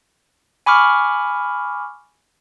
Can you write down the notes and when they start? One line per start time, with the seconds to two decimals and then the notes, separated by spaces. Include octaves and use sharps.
0.66 G#5 B5 C#6 D6 F6